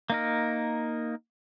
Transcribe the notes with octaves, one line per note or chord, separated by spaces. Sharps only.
A#3 D#4 A#4